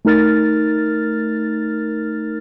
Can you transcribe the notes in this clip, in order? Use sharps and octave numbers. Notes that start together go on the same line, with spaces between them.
A3 D#4 A#4 F6 A6